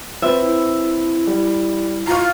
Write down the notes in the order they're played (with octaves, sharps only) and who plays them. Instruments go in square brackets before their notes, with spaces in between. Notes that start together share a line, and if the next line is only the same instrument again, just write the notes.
[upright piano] C4 B4 [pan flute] F4 [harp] E5
[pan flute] E4
[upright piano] G3
[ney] F4 [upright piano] A#5 C#6